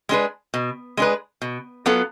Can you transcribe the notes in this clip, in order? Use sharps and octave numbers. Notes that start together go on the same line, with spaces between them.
G#3 D4 G#4 B4
B2
G#3 D4 G#4 B4
B2
F#3 B3 F4 A4